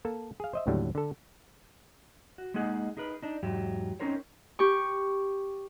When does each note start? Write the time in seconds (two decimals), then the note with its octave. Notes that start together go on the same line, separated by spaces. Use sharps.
0.05 A#3 A4 A5
0.40 G#4 F5
0.53 C5 D#5 E5
0.67 D#2 A2 D3 F#3 G3
0.95 D3 A4
2.38 F#4
2.54 G#3 A#3 D#4 G#4 F#5
2.97 D#4 G#4 A#4 B4
3.22 D4 D#4
3.43 E2 G#2 F#3 G4
4.00 C4 C#4 D#4 A#4 C5 C#5
4.59 G4 C#6